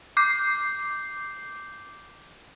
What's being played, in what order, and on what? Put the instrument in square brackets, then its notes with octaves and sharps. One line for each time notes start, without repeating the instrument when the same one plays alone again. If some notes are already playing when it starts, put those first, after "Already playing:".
[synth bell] D6 G6 C7